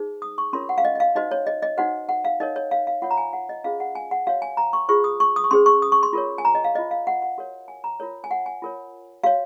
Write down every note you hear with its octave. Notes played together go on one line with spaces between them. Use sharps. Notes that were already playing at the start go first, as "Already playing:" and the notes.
Already playing: D#4 G#4 C5
D#6
C#6
C#4 F4 A#4 C#5 C6
F#5
F5
D#5
D#5
F5
D#4 F#4 C5 D#5
C#5
D#5
D#5
D#4 F#4 C5 F#5
F#5
F5
D#4 A#4 C#5 D#5
C#5
F5
F5
F4 A#4 C#5 F#5
A#5
G#5
F#5
D#5
C#4 F4 G#4 C5 F5
F#5
G#5
F#5
F#4 C#5 F5
G#5
A#5
C#6
F4 G#4 C5 C#6
D#6
C#6
D#6
C#6
C#4 G#4 C5 C6
C#6
D#6
C#6
C6
F4 A#4 C#5
G#5
A#5
D#5
F5
F4 C5 D#5
F5
F#5
F#5
F#4 A#4 C#5
G#5
A#5
F4 A#4 C#5
G#5
F#5
G#5
F4 A#4 C#5
F#4 C#5 F5